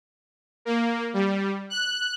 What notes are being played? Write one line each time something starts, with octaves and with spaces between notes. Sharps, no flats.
A#3
G3
F#6